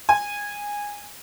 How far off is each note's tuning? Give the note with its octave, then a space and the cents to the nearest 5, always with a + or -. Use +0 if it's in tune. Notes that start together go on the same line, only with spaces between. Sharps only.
G#5 -15